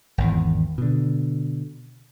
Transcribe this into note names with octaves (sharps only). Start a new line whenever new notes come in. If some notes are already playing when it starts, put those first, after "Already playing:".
G#1 E2
B2 D3